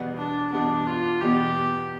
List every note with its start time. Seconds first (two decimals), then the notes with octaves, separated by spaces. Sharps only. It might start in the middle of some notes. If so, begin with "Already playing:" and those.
Already playing: E2 B2 G3 B3
0.18 D4
0.52 E2 B2 G3 B3 D4
0.87 F4
1.21 E2 B2 G3 B3 G4